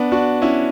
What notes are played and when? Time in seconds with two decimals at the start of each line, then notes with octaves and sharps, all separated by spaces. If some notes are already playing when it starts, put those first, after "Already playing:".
Already playing: B3 D4
0.12 D4 F#4
0.42 C#4 E4